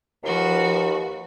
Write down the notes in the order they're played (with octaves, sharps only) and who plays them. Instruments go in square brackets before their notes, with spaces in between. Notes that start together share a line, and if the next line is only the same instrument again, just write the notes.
[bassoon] D#2 [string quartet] F3 F#4 B4